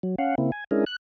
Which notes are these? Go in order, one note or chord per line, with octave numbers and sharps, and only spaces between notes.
F#3
C#4 F5 F#5
C#3 A#3 C4 E4
G#5
G#3 C#4 D4 E4 G#4 A#4
F#6